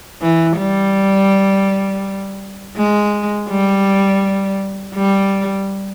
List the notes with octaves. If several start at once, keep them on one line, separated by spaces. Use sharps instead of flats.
E3
G3
G#3
G3
G3